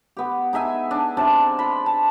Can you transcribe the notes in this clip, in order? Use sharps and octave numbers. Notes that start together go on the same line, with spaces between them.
B3 G4
D#4 G#4 E5 G#5
D4
C3 D4 D5 A5
B5 C6
A5